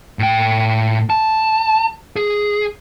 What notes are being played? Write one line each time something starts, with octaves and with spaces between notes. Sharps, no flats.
A2 G5
A5
G#4